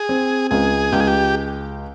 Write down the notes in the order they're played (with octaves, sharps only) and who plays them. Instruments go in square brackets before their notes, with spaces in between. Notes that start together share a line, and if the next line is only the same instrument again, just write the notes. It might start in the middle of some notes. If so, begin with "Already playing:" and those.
Already playing: [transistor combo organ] G#4
[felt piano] C4
[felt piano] C#2 [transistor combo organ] G#4
[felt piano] C#2 [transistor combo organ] G4
[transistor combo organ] G#4
G4